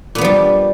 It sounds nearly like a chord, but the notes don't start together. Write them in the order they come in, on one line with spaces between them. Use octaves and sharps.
A#2 B3 F3 G3